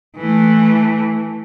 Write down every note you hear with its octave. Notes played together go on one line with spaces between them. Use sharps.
E3 A3